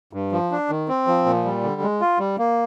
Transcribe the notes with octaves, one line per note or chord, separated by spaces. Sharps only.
G2
F3
D4
D#3
C4
F3
A#2
G3
D3
G#3
F4
G3
A#3